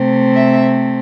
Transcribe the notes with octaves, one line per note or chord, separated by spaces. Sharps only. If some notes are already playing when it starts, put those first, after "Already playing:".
Already playing: C3 A3 C4
E5